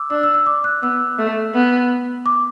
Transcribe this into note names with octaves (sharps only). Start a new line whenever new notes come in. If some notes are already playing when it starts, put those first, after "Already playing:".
Already playing: D6 E6
D4 E6
E6
E6
D6
F#6
B3 E6
A3
B3
D6